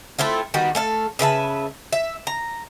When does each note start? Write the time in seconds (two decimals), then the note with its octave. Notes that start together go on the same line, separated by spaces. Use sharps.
0.19 A3 C4 E4 F4
0.54 D#3 G3 B3 F#4
0.75 A3 A4 F5
1.19 C#3 B4 E5 A5
1.93 E5
2.27 A#5